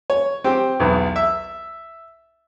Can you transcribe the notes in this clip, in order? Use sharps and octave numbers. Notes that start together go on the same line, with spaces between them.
C#5
C4 G4 G5
B1 E2
E5